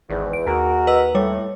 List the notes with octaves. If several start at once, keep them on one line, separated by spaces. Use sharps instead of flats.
G#1 E2
D7
D#2 F#4 G#4 A#4
B4 D#5 E6
A2 G3 C#5